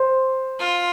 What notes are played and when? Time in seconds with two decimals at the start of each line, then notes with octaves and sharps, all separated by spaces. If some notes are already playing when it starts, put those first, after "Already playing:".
Already playing: C5
0.59 F4